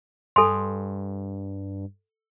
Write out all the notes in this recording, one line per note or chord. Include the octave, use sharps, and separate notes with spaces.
G2 A4 G#5 C6